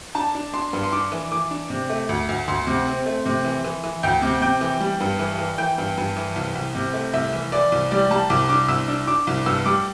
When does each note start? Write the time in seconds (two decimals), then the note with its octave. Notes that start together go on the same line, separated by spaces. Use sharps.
0.15 D4 A5
0.35 D4
0.54 D4 C6
0.73 G2
0.83 C6
0.93 D4 D6
1.12 E3
1.32 E3 D6
1.51 D4
1.70 C3
1.90 A3
2.09 D2
2.29 D2
2.48 D2 C6
2.67 C3
2.87 C4
3.06 A3
3.26 C3
3.45 E3
3.64 E3
3.84 E3
4.03 D2 G5
4.22 C3
4.42 C3 G5
4.61 E3
4.80 G3
5.00 G2
5.19 E3
5.39 E3
5.58 E3 G5
5.78 G2
5.98 G2
6.17 E3
6.36 C2
6.55 C2
6.75 C3
6.94 A3
7.13 C2 E5
7.33 E3
7.52 E3 D5
7.72 C2
7.91 G3 D5
8.10 G3 A5
8.30 C2 D6
8.49 D4 D6
8.68 C2 E6
8.88 D4
9.07 D4 D6
9.27 C2
9.46 G2 E6
9.66 G3 D6